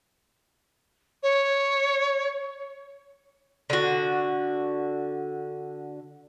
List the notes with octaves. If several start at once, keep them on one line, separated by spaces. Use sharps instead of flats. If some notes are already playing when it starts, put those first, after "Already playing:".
C#5
D3 F#4